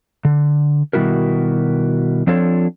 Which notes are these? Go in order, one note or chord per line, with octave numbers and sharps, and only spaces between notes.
D3
B2 D#3 G3 E4 F#4 A#4
F3 C4 D4 F4 A4 C#5